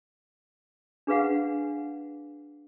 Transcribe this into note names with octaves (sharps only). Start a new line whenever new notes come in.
D4 G#4 B4 F5 F#5